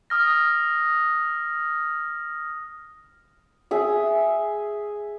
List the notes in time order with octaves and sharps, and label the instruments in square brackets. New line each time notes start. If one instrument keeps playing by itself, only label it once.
[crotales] D#6 F6 A#6
[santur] G#4 E5